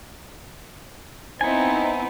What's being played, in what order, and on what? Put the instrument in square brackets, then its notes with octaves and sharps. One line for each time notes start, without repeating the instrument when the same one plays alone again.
[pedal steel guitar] B3 G#5 [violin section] C4 D#4 E4